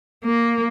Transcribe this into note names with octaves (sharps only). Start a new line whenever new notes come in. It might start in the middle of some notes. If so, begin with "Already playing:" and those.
A#3